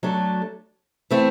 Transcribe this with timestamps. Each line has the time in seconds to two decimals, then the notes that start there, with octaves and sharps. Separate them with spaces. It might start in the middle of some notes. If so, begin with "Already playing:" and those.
0.03 F#3 A3 D4 A4
1.10 E3 A3 C4 E4